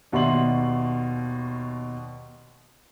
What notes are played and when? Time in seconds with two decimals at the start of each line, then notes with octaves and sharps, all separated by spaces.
0.12 D#2 B2 D5 E5 C6 F#7